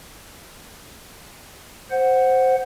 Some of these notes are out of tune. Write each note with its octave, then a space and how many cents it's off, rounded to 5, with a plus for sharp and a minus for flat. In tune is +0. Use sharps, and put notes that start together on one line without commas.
C5 +0 F#5 +0